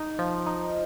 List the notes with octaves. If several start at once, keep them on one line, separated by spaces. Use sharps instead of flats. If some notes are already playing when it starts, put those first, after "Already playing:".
Already playing: D#4
F3
D#4